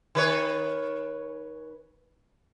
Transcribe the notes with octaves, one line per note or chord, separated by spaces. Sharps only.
D#3 B4 C#5